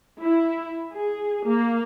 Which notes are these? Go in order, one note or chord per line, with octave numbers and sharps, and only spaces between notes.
E4
G#4
A#3